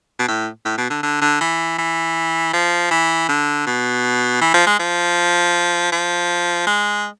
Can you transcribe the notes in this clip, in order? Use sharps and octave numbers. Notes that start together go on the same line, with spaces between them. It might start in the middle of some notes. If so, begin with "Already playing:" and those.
B2
A2
A2
B2
D3
D3
D3
E3
E3
F3
E3
D3
B2
E3
F3
G#3
F3
F3
G#3